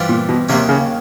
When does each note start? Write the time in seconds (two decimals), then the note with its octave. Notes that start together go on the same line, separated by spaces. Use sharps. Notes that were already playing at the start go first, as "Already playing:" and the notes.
Already playing: G2 E3 G3 C4 F4
0.09 A#2
0.29 B2
0.49 D#2 C3 D#3 F#3 A#3 C#4
0.69 C#3